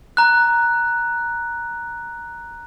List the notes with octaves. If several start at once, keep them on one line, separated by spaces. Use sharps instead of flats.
A#5 F#6